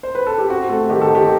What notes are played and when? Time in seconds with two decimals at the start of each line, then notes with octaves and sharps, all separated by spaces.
0.03 C5
0.15 B4
0.27 A4
0.38 G4
0.50 C4 F#4
0.69 A3
0.89 D#3 G4
1.02 A4
1.09 D#3
1.15 G4